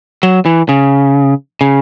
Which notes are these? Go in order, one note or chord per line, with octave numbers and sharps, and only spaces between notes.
F#3
E3
C#3
C#3